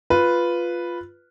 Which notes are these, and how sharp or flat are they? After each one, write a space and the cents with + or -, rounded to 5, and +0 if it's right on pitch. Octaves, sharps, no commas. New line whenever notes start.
F4 +0 B4 +0